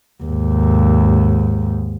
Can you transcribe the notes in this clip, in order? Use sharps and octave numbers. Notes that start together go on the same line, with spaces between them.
D#2 G#2